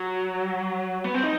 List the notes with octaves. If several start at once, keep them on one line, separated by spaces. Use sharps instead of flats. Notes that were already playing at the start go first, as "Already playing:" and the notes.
Already playing: F#3
B3
C4
D#4